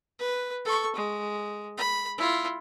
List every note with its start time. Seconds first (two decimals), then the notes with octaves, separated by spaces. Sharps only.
0.19 B4
0.65 A4 C#6
0.96 G#3
1.77 B5
2.18 E4 F4